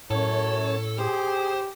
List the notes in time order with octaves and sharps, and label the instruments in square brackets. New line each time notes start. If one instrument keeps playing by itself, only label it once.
[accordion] F#2 C#5 [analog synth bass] A2 [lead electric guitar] A4
[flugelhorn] G4 [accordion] G#4 [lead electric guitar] C5